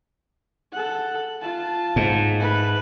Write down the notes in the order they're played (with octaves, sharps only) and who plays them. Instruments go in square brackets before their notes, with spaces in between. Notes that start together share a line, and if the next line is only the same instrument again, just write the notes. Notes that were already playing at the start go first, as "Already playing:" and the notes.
[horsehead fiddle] A4 F#5
F4 A5
[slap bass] G#2
[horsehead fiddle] A3 B4